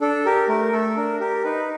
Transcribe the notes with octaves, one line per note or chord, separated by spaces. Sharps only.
D4 A4
G4 A#4
A3 A#4
A3 A4
D4 A#4
G4 A#4
D#4 B4